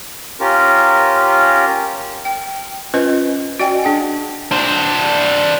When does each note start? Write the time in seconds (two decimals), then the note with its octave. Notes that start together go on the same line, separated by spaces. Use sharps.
0.40 C#4 F4 G4 A#4
2.25 G5
2.94 C#4 F4 B4 C5 D#5
3.60 F#4 D5 D#5 G5 G#5
3.83 D4 G#4 F#5 G5
4.51 D4 C5